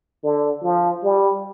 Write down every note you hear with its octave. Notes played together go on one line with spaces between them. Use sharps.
D3
F3
G3